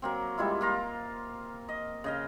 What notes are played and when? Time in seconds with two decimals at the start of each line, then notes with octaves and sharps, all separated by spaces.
0.02 F#3 A#3 C4
0.38 G3 G#3 E4 F4
0.61 A#3 F4 A#5
1.69 D#5
2.04 C#3 D#5 F5